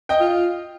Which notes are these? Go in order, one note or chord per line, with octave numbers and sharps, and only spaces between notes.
D#5 G5
F4